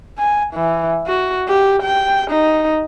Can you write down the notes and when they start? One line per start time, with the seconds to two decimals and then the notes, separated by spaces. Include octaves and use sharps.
0.18 G#5
0.54 E3
1.07 F#4
1.48 G4
1.83 G5
2.31 D#4